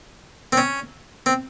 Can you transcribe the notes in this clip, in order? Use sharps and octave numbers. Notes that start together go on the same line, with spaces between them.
C4
C#4
C4